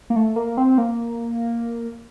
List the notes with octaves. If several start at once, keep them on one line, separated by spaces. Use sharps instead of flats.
A#3
A3
A#3
C4
A#3